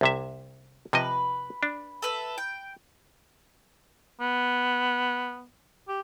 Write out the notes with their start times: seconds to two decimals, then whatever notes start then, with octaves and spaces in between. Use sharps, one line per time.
0.01 C2 C3 E5
0.93 C3 F3 B4 D#5
1.63 D4
2.02 A4 B4 E5
2.38 G5
4.21 B3
5.88 G4